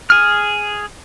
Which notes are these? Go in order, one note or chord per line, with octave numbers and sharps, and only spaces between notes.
G#4 F6